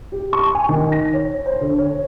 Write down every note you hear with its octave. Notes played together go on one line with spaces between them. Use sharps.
G4
C#6
G#5
D#3
A#6
C#5
C5
D3
C#5